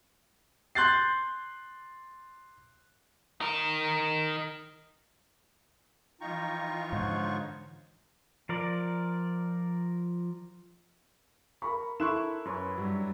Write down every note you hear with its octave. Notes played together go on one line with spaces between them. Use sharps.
C6 F#6 G6 A6 C7
D#4 A#4
E3 F3 D#4 F4 G5 A#5 C#6
G#2 D3 C5 C#5 F#5
F3 A#4 D5
A#4 A#5 B5 C#6
E4 A4 C6 C#6 F#6 E7
F#2 B4 C#5 G5
G2 F#3